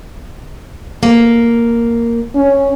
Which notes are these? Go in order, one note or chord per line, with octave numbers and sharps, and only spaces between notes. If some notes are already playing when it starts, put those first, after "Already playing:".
A#3
C#4